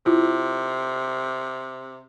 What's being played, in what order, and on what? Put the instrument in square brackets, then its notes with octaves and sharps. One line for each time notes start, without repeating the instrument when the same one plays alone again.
[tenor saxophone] C3 [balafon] E4 F4